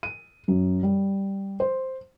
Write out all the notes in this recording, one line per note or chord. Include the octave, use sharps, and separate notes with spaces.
D#7
F#2
G3
C5